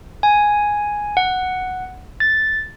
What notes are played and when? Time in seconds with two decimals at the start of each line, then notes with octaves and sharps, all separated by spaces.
0.23 G#5
1.17 F#5
2.20 A6